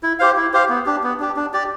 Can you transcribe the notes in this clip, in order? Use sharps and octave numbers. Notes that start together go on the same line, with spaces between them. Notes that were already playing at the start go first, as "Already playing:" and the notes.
E4
G4 C5 F5
E4
G4 C5 F5
B3
D4 G4
B3
D4 G4
D4
G4 D5